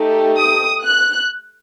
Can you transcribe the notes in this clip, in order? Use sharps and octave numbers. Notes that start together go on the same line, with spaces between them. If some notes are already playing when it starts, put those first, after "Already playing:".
Already playing: A3 D#4 G4
D#6
F#6